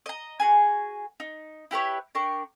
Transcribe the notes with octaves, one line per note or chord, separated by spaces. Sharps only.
D#5 A#5
F#4 G#4 G#5
D#4
E4 G4 B4 C#5
D4 A#4 G5 C#6